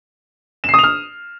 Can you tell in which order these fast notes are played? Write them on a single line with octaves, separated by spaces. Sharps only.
E7 C7 D#6 F7 F6